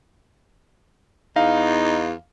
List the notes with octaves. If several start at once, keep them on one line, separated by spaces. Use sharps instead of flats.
E2 D#4 F5